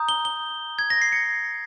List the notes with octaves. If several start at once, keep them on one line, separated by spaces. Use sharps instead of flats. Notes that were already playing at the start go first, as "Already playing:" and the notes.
Already playing: A#5 D#6 G6
G7
G7
G#6
A#6
C7
C#7